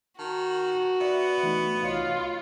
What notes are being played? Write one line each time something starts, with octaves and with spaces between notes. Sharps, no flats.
D#3 F#4 A5
B3 D5 E5
E3 A3 D#4
C2 F4 C#5 D#5